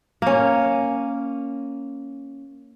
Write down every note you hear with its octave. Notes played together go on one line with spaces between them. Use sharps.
A#3 C#4